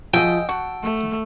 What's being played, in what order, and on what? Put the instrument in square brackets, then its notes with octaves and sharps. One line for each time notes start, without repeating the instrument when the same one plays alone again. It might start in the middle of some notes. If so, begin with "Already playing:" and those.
[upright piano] F3 E6 [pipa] F#4 G#4 D#5 [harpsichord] G5
[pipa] F#4 [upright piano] A5
[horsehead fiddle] A3